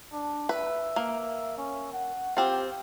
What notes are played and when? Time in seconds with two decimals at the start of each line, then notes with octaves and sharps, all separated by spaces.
0.13 D4
0.49 B4 E5
0.96 A#3
1.58 C#4
1.93 F#5
2.37 C4 F4 G4